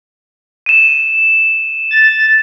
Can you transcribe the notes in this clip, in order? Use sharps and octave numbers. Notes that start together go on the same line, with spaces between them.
D#7 E7
A6